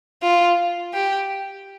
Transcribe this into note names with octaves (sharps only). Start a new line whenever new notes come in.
F4
G4